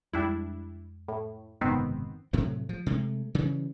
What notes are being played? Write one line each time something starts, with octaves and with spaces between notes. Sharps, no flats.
F2 G3 G#3 D4 E4
A2
F#1 G#2 C3 D#3 B3 C4
A2 C3 F#3 A3
F3
C3 G#3 A3
C#3 E3 G3